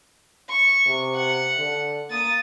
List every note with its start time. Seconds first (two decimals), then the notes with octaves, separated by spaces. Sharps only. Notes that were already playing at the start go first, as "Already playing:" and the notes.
0.50 C#6
0.87 C3
1.16 F#5
1.58 D3
2.11 A#3 D#6 A6